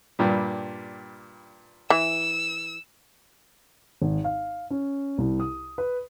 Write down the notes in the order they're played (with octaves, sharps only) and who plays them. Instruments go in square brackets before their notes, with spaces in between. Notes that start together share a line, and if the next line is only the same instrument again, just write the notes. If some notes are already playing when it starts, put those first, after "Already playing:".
[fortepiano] G2 A#2 G3
[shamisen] E3 [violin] E6
[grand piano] G#1
F5
C#4
C2
D#6
B4